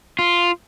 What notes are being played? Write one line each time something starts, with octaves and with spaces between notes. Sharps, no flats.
F4